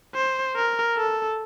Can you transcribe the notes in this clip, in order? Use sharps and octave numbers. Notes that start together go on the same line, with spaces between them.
C5
A#4
A4